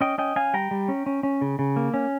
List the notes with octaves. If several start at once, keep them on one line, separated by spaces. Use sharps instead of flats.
C#4 D#5 G5
C#4 D#5 G5
C#4 F5 G#5
G3 G5 A#5
G3
C#4
C#4
C#4
C#3
C#3
A#3
C#4